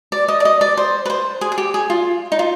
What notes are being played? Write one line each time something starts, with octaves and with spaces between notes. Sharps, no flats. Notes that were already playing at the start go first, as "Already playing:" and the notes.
D5
D#5
D5
D#5
D5
C5
B4
C5
G#4
G#4
G4
G#4
F4
D#4
F4